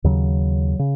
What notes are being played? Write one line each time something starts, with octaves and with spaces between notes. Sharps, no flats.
D#2 C#3 F#3
C#3